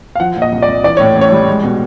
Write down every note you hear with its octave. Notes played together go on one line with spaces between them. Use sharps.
F5
F3 F#5
A#2
D#5
C2
D5
C2
E3 D5
A2 C#5
A1
C#5
G3
G#3
B2